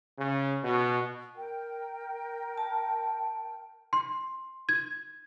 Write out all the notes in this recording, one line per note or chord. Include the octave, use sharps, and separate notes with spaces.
C#3
B2
A#4 G5
A5
C6
G#6